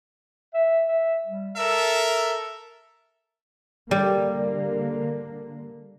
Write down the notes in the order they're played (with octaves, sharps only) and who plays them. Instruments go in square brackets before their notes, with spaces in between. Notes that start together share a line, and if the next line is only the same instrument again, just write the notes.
[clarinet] E5
E5
G3
[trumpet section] A4 A#4 E5 [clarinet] E6
[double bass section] D3 A#3 [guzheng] G3